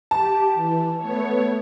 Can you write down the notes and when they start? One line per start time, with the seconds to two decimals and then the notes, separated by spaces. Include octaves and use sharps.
0.11 G4 A5
0.55 E3
0.97 A3 B3 C#5